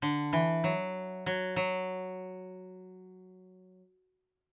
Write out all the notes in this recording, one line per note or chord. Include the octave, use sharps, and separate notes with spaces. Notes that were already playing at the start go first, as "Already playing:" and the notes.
D3
E3
F#3
F#3
F#3